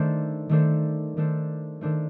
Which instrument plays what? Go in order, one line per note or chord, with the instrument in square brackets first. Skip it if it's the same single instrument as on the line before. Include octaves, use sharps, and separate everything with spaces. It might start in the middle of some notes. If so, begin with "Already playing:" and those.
Already playing: [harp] D#3 A3 D4 A4 C5
D#3 A3 D4 A4 C5
D#3 A3 D4 A4 C5
D#3 A3 D4 A4 C5